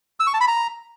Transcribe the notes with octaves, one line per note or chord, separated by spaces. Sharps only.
E6
C#6
A5
B5
A#5